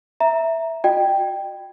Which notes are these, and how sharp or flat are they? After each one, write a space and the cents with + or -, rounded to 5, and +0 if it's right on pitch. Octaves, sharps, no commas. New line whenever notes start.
E5 +0 A#5 +0
F#4 -30 D#5 -35 G5 +0